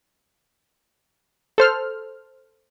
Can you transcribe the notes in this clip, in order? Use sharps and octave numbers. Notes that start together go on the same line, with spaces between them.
A4 C5 F6